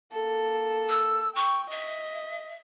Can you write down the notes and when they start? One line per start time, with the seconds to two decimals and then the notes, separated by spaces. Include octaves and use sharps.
0.13 A#3 A4
0.89 E6
1.35 G5 C#6
1.70 D#5 E5